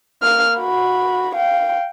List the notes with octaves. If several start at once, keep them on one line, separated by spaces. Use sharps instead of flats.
A#3 F6
F#4 B5
F5 G5